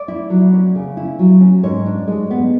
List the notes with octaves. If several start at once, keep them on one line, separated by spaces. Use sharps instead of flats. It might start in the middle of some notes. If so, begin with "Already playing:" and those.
Already playing: D5
E4
F#3
C#4
C#3
E4
F#3
C#4
G#2 C#5
D4
G#3
B3